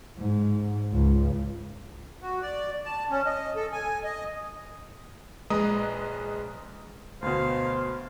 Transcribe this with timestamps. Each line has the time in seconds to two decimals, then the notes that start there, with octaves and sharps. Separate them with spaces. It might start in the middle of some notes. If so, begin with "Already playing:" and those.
0.18 G#2
0.93 C#2
2.22 F#4
2.42 D5
2.85 A5
3.10 C#4
3.26 D#5
3.56 A4
3.72 G#5
4.04 D#5
5.50 A#1 G#3 B4 D#5 A#5 D#6
7.22 D2 B2 C5 F5